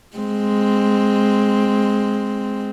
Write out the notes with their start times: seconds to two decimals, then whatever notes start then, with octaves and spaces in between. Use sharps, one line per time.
0.17 G#3 C4